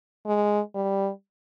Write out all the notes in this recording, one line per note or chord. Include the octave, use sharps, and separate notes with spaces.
G#3
G3